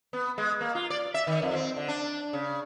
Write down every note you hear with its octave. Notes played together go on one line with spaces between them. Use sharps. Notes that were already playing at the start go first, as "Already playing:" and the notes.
B3
G#3
A#3
F4
D5
E5
D#3
F2
C4
D3
D4
C#3